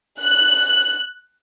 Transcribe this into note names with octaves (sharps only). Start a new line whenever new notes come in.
F#6